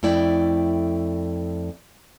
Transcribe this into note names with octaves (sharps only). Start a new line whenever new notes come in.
F2 A3 E4 D5 G5